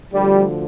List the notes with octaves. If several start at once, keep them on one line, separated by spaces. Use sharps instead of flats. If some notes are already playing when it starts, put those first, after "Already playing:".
D2 D3 F3 G3